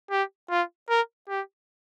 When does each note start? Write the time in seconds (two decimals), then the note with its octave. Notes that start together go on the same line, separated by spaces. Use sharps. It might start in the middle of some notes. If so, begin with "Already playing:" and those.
0.11 G4
0.50 F4
0.89 A#4
1.29 G4